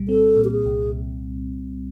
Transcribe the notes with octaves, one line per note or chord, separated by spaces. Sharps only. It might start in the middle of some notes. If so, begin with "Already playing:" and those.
Already playing: C2 A#2 G3
C4 A4
A#2
G4
G#4
C2